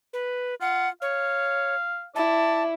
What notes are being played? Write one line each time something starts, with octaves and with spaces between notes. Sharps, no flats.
B4
F4 F#5
C#5 F5
E4 D5 A5